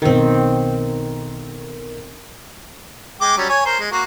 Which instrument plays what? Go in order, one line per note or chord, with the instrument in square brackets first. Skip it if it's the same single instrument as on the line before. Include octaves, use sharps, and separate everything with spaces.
[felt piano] B1 A#4 [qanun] D#3 C4
[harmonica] G#3 G5 D6
F#3 G3 C#4
C#5 G#5
A#4 C5 C6
G#3
A#3 F#4